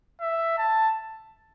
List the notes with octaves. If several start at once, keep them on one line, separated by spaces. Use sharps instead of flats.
E5
A5